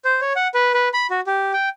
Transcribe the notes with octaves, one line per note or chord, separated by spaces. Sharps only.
C5
C#5
F#5
B4
B4
B5
F#4
G4
G5